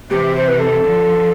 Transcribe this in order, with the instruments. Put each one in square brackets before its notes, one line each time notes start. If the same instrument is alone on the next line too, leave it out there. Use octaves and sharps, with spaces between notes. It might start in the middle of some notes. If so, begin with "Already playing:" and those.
[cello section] C3 E3 [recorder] G4
[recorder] C5
B4
A4
[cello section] D3 F3